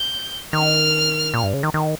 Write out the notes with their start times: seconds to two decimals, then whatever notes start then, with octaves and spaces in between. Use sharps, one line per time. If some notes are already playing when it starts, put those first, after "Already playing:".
Already playing: G6
0.53 D#3 F6
1.34 A#2
1.43 G2
1.53 C#3
1.63 D#3
1.74 D#3